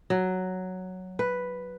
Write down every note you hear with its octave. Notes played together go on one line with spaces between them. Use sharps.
F#3
B4